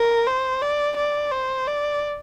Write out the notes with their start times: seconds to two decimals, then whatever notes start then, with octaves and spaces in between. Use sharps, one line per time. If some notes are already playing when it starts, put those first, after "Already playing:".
Already playing: A#4
0.27 C5
0.62 D5
0.97 D5
1.32 C5
1.67 D5